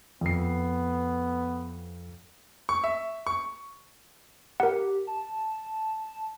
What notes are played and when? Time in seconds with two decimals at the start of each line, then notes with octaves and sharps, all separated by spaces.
0.21 F2 B3 C7
2.69 C#6
2.84 E5
3.27 C#6
4.60 G4 A#4 F#5
5.07 A5